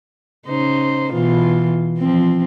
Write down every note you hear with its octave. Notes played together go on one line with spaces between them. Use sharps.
C#3 D#4 C5
B2 E3 F4
F3 C4